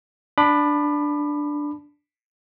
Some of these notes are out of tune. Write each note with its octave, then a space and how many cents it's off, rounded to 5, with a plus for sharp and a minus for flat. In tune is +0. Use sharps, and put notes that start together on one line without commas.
D4 +0 B5 +5 D6 +35